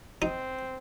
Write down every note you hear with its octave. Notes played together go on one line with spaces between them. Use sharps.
C4 D#4